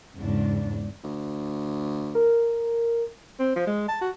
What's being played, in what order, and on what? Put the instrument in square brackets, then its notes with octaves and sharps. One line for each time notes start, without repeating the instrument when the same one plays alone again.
[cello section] E2 G#2 C#3 D4
[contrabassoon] D2
[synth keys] A#4
[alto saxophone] C4
F3
G#3
A5
F#4